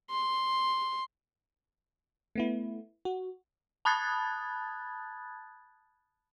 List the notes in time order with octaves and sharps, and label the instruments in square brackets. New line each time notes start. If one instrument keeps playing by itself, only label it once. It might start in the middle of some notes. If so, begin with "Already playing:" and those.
[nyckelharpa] C6
[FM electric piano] A3 B3 E4
F#4
[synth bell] A5 B5 D#6 F#6 G#6 A6